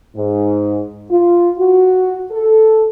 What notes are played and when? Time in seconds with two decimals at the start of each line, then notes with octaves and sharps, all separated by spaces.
0.16 G#2
1.11 F4
1.58 F#4
2.31 A4